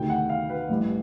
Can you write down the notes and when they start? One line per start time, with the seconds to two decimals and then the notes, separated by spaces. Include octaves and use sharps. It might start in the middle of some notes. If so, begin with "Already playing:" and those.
Already playing: D2 C3 D#3 G5
0.10 F#5
0.29 F5
0.50 B4
0.69 A1 G2 E3